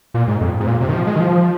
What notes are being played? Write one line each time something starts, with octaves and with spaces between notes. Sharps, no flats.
A#2
G#2
F2
G#2
A#2
C3
D#3
F3
G#3
D#3
F3